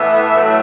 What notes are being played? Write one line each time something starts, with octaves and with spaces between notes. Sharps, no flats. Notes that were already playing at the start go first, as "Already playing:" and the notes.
Already playing: A2 E3 B3 E5
A2 F#3 A3